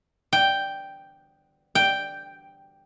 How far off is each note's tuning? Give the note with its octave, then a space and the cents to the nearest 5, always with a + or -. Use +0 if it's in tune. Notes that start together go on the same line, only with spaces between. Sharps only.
G5 +0
G5 +0